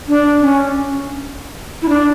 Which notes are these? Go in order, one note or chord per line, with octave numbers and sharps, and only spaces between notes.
D4
C#4
E4
D4